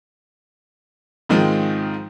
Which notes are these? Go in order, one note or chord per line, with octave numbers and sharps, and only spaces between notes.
G#2 D#3 F3 G#3 C4 F4